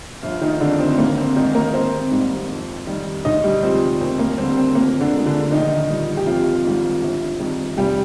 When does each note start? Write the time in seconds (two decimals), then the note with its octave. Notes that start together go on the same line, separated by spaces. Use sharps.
0.23 G1 F3 F4
0.42 D#3 D#4
0.60 F2 D3 D4
0.79 C4
0.98 G#1 A#3
1.17 C4
1.36 G#2 D#3 D#4
1.55 A#3 A#4
1.74 G#1 C4 C5
2.11 G#2 D#3 G3
2.50 F2
2.87 D#3 G3
3.25 D2 D#4 D#5
3.44 G3 G4
3.63 C3 F3 G#3 C4
4.01 D#2 C4
4.19 A#3
4.38 D3 G3 C4
4.57 C4
4.75 F2 A#3
5.00 D3 D4
5.13 D3 F3 G#3
5.26 D3 D4
5.51 A#1 D#3 D#4
5.89 A#2 G3
6.17 G4
6.27 G#1 F3 F4
6.64 G#2 D#3 G3
7.02 G1
7.40 F2 D#3 G3
7.77 F1 G3 G4